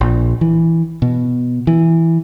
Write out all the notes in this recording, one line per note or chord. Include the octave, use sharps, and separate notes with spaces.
A#1
E3
B2
E3